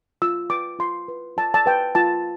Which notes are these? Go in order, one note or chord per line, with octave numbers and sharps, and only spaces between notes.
F4 E6
B4 D6
F4 C6
B4
F4 A5
A5
B4 G5
F4 A5